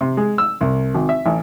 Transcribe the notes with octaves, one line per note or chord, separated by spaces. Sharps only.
C3
G#3
E6
C2
G#1
E5
A1